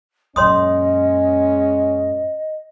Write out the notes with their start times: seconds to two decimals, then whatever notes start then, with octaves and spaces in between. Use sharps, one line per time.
0.36 F#2 A#2 G#3 C#4 C#5 D#5 C6 D#6